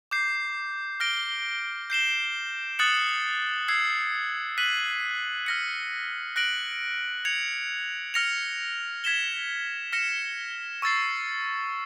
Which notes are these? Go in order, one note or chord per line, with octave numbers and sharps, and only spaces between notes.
D6 G6 C7
F6 A#6 D7 G7
G6 C7 E7 G7
D#6 F#6 A6 C#7 F#7
E6 G#6 C7
F#6 B6 D#7 F#7
F6 A#6 C#7
F#6 A#6 D7 F#7
G#6 C#7 F7
F6 A#6 C#7 F7
G#6 B6 E7 G7
F6 A#6 C#7 E7
C#6 E6 A6 C7